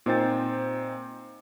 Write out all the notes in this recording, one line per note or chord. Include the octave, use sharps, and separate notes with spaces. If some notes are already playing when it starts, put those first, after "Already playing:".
A#2 C4 D#4 C5 G5 A6